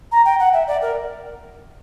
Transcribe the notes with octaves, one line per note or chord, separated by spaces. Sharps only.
A#5
G5
F#5
E5
D5
A#4